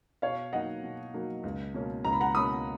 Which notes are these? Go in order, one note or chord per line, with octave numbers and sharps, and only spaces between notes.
B2 C#5 F5
F#3 A#3 D#4 D#5 F#5
B2
F#3 A#3 D#4
C#2
B2 A#3 C#4
C#2 A#5
B5
F#5 A#5
B2 A#3 C#4 B5 D#6